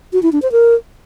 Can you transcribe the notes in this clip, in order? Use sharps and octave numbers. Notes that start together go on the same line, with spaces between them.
F#4
E4
D4
C5
A#4